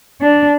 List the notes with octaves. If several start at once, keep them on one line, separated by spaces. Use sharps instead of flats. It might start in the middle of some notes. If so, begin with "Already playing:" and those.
D4